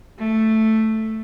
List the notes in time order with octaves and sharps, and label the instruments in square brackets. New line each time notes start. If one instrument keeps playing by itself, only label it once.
[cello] A3